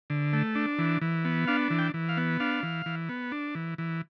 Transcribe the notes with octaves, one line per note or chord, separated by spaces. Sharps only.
D3
A3
D4
E3
E3
B3
D4 F5
E3
G5
E3
F5
B3
D4 F5
E3
E3
B3
D4
E3
E3